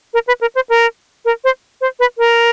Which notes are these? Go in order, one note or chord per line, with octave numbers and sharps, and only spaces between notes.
A#4
B4
A#4
C5
A#4
A#4
C5
C5
B4
A#4